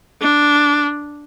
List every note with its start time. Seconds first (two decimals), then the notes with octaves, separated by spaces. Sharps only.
0.21 D4